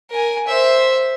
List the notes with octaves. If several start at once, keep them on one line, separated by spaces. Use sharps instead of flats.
A#4 G#5
C5 E5